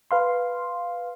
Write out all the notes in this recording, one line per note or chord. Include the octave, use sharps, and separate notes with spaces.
B4 F5 C6